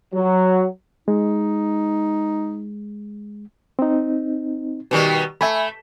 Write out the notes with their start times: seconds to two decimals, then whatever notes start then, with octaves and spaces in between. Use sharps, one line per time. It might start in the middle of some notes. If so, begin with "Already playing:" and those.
0.14 F#3
1.08 G#3 D#4
3.79 C4 D#4
4.91 B2 D#3 G3
5.41 A3 E5 G#5 B5